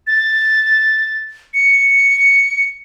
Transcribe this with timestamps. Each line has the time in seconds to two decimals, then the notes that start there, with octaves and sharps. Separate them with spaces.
0.07 A6
1.54 C#7